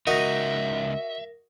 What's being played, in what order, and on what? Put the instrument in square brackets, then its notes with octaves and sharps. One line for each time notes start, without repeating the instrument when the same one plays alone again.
[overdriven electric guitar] C#2 D#4 [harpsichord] F#4 D#5 [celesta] A#4 A#6 [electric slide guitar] E5